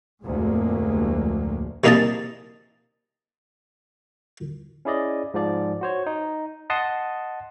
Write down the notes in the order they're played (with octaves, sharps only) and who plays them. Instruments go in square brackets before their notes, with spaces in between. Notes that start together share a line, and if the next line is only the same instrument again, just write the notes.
[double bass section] F1 D2 A2 G#3 A#3
[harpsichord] C3 A#3 D#4 G#4 D#5 A5
[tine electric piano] C#4 E4 G#4 D5 D#5
G#2 F3 D5
F#4 C5 C#5
D#4
D#5 F#5 A5 C6 D#6